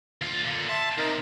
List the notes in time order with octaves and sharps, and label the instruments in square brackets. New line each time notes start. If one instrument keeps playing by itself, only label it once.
[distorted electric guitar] D2 F4
A#2 D3
[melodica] E5 C6 [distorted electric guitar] A5
[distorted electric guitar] C3 [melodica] D#4 A#4